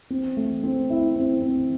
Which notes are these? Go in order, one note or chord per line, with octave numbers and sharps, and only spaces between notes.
C4
A3
C4
E4
C4
C4